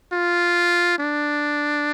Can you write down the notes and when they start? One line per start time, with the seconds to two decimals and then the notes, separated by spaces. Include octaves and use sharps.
0.13 F4
0.99 D4